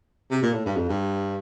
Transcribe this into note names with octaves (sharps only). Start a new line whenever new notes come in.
C3
A#2
A2
G2
F2
G2